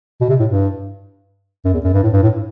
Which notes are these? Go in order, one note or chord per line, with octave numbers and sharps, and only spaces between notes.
B2
C3
A2
G2
F#2
E2
F#2
G2
A2
G2
A2